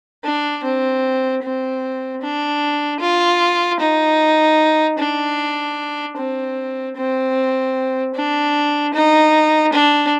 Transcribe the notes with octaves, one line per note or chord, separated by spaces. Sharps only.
D4
C4
C4
D4
F4
D#4
D4
C4
C4
D4
D#4
D4